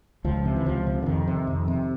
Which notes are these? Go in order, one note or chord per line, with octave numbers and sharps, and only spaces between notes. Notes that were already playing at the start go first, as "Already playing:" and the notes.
C#2 F3
C3
E3
C#2 F3
C3
D3
F2 D#3
C3
F2
C3